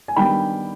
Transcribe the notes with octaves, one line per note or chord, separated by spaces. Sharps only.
G#5
D#3 G3 B3 D4 G5 B5